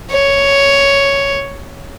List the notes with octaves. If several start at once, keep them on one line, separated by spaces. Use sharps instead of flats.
C#5